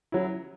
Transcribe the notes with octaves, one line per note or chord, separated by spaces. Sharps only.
F#3 C#4 E4